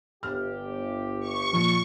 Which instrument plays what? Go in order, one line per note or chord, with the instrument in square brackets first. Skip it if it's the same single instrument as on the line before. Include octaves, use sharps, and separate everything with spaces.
[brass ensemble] G1 G4 [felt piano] F6
[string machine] C#6
[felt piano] A#2 F3